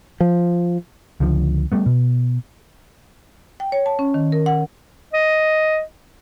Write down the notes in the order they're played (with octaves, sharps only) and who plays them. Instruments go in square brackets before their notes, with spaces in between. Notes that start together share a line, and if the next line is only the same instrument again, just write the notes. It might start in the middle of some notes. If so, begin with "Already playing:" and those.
[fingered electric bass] F3
[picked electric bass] C#2 D3 F3
G3 A3 B3
B2
[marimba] G5
C#5
A5
C#4
D#3
A#4
F#5
[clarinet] D#5